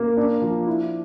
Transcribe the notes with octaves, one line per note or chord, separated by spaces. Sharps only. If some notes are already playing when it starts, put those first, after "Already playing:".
Already playing: A#3
D4
F3
E4